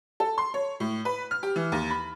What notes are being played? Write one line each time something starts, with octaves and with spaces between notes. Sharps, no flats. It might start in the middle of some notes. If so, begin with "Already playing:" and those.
A4
C6
C#5
A2
B4
F6
G4
E3
D#2
B5